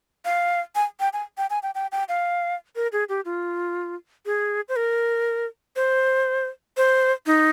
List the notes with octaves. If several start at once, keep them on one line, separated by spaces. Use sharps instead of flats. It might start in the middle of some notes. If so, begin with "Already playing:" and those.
F5
G#5
G5
G#5
G5
G#5
G5
G5
G5
F5
A#4
G#4
G4
F4
G#4
C5
A#4
C5
C5
D#4